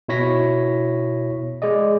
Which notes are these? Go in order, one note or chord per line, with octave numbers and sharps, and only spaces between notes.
B2 E4 C#5 A#6 B6
G#3 G#4 D5 D#5